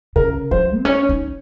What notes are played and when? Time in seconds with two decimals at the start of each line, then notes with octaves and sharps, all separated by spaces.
0.16 C#3 A#4
0.51 F3 C5
0.77 C4
0.85 C#4 C#5
1.09 D#4